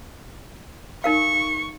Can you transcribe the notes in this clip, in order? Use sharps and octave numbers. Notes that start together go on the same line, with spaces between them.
D#4 A#4 F5 C#6